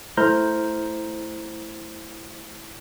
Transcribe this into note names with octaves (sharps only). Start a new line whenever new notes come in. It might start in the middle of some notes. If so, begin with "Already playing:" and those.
A3 E4 C5 A#5 F6 G6